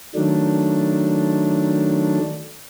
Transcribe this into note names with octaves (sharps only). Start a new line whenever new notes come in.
D#3 F#3 A3 D4